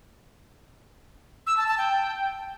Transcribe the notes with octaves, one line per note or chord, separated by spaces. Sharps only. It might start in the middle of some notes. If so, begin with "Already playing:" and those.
E6
A5
A5
G5